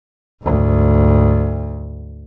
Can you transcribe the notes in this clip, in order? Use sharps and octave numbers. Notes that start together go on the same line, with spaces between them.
D2 G#2